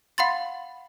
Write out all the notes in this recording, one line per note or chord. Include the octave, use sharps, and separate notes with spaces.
F5 F#5 B5 C6 A6